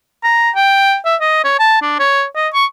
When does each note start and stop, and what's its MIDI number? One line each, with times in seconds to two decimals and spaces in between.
0.23 0.50 82
0.55 0.96 79
1.05 1.16 76
1.20 1.44 75
1.44 1.55 73
1.59 1.80 81
1.82 1.95 62
1.99 2.25 73
2.36 2.48 75
2.54 2.65 85